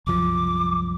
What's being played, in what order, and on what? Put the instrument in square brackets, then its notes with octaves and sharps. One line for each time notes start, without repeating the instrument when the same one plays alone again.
[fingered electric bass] C2 F#2 F3 [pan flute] D6